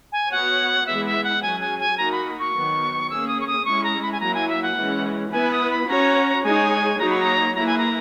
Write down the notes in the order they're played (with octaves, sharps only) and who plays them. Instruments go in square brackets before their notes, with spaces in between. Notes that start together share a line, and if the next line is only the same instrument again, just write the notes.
[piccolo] G#5
[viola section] B3 F#4 C#5 [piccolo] F#5
[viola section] E3 G#3 B3 E4 [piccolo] E5
[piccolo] E5
F#5
[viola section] F#3 C#4 G#4 [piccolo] G#5
[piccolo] G#5
G#5
[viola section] A#3 D#4 F#4 A#4 [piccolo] A#5
[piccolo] B5
C#6
[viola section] D#3 F#3 B3
[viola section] A#3 C#4 G#4 [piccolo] E6
[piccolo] D#6
C#6
D#6
[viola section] G#3 C#4 E4 [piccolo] C#6
[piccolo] A#5
B5
G#5
[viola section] F#3 A#3 E4 [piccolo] A#5
[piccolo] G#5
E5
F#5
[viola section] E3 G#3 C#4
[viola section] B3 E4 B4 [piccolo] G#5
[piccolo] D#6
B5
[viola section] C#4 F#4 C#5 [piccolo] A#5
[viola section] G#3 D#4 G#4 C#5 [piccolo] G#5
[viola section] F#3 A#3 D#4 F#4 C#5 [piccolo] A#5
[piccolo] B5
A#5
[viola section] A#3 E4 G#4 B4 [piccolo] A#5
[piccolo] G#5
A#5